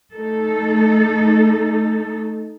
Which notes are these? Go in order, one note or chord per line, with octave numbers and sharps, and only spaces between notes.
A3 D#4 A4